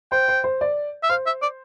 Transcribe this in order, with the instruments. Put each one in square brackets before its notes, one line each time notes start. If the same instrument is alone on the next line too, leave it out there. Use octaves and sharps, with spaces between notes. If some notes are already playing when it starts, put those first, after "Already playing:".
[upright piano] C5 [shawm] G5
[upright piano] C5
C5
D5
[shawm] E5
[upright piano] C5 [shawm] F5
[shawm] E5
D5